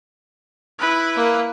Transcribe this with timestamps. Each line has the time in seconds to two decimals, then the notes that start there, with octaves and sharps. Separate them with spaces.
0.79 E4 B4
1.16 A#3